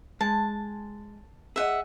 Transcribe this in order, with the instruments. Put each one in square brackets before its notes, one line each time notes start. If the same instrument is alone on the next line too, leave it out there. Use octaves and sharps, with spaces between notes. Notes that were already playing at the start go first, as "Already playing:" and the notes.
[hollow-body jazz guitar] G#3 [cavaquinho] A5
[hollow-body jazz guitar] G#4 D#5 [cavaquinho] E5 F#5